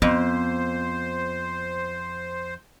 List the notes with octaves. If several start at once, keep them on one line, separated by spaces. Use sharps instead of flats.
F2 B3 C5